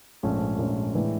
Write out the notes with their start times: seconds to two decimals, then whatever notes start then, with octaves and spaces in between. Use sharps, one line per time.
0.23 A#1 G#2 F3 A3 C#4
0.58 A#1 G#2 F3 A3 C#4
0.94 A2 E3 G#3 B3 D4